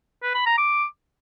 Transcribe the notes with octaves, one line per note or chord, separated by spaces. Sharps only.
B4
B5
A#5
D6